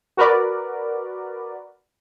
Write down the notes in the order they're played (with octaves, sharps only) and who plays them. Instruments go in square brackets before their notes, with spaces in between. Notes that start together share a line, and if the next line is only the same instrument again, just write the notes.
[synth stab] F#4 A#4 B4 D5